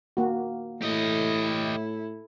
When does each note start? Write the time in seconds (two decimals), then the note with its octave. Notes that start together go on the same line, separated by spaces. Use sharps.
0.17 A#3 F#4
0.82 A2 E4 G4 A4 D#5